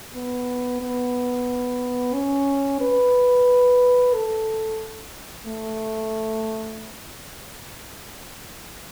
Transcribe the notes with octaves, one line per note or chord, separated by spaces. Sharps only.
B3
B3
C#4
B4
A4
A3